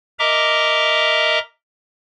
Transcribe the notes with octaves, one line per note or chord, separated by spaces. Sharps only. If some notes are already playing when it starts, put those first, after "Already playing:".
A#4 D#5 E5 A#5 D6